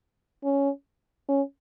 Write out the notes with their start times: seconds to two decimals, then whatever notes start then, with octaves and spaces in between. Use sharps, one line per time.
0.44 C#4
1.28 C#4